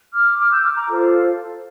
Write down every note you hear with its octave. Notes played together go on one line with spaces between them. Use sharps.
D6 F6
D6 F6
E6 G6
D6 F6
A#5 D6
F4 A4 C5